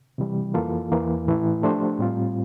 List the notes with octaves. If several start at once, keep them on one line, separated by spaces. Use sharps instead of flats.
C3 E3 G3
F2 E3 A#3 F4 A4
E2 E3 A#3
A2 E3 A3 E4
F3 A3 D4 G4 C5
A2 G3 C4 F4